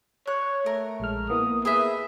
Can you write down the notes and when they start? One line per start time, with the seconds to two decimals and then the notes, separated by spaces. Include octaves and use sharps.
0.27 C#5 F#6
0.66 A3 A#4
1.00 A#1 G#3 F6
1.30 A#3 B3 E4 D#6
1.65 G#4 B4 D#5 E5